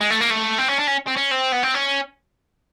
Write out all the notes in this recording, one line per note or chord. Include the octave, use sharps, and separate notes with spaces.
G#3
A3
A#3
A3
C4
C#4
D4
C#4
C4
C#4
C4
B3
C4
C#4